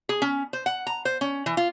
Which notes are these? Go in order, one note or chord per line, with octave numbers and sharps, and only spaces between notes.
G#4
C#4
C5
F#5
A#5
C5
C#4
E3
F4